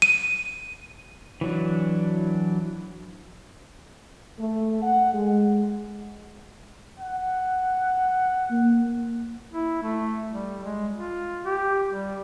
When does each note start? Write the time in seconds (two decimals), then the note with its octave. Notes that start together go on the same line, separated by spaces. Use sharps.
0.02 D#7
1.41 E3 F#3 D4
4.39 A3
4.82 F#5
5.13 G#3
6.99 F#5
8.51 A#3
9.52 E4
9.83 A3
10.31 G3
10.64 G#3
10.93 F4
11.45 G4
11.90 G3